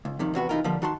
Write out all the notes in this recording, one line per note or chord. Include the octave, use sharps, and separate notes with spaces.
C#2
F2 C3 D#3
E2 C3 F#4 B4
C3 E3 D#4 F4 A#4
D3 F3 G3 A#3
D#3 F#4 A5 C6